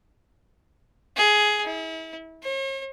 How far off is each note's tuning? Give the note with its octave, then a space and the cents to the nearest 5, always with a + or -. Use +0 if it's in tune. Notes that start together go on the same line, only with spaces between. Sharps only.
G#4 +15
E4 -35
C#5 -45